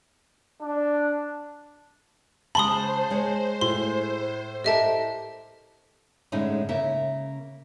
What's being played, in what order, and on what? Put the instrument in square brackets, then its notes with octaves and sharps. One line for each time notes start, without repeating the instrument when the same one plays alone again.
[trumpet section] D4
[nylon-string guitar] C#3 G#3 [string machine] C5 [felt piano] A5 [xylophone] B5 C6 D#6
[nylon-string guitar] G#3 C#5
[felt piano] A2 [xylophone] C6
[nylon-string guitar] G4 A4 A#4 [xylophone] D#5 E5 A5
[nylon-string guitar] A2 D3 G#3 C#4 D#4 E4
C#3 A#3 E5